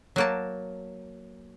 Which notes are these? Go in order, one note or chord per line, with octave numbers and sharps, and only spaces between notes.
F#3 A#3 A5